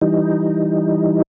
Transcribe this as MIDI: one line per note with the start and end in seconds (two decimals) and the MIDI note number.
0.01 1.22 52
0.01 1.22 55
0.01 1.22 63